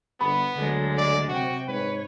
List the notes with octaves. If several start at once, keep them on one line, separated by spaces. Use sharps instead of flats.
G1 B3 B5
D2 D3 F#3 G#3
D5
C3 F#4 G5
G#2 B4 C#5